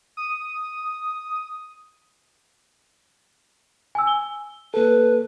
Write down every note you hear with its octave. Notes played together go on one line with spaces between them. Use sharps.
D#6
G#5 E6
G7
A#3 A4 B4